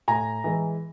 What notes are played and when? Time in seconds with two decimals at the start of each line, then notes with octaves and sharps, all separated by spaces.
0.08 A2 G#5 A#5
0.44 E3 G#3